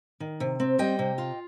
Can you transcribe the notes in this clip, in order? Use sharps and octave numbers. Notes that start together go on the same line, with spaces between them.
D#3
C3
C4
G3 D#5 G5
C3
F4